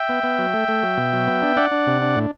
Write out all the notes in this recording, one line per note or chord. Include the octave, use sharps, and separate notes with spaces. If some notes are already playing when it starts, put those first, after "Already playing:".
Already playing: E5 G5
B3
B3
F#3
A3
A3
F#3
B2
F#3
B3
D4
D4 D5 F#5
D4
C3
D4
A2